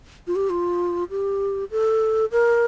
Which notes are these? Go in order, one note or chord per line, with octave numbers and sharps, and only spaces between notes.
F4
G4
F4
G4
A4
A#4